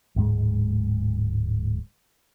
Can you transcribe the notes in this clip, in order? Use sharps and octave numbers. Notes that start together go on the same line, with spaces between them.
D1 G#2 G#3